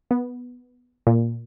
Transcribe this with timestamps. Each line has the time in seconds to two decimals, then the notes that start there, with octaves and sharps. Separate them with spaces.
0.11 B3
1.07 A#2